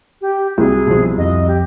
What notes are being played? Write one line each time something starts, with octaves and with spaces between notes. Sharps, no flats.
G4
C2 F#3 G#4
B2 F3
F2 D#5
G4